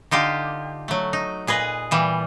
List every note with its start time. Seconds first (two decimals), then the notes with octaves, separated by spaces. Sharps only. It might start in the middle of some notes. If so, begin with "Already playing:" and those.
0.11 D3 D#4 F4 G4
0.88 F#3 A3
1.13 D#4
1.47 A#2 G#4 B4 D#5
1.91 A#2 E3 G3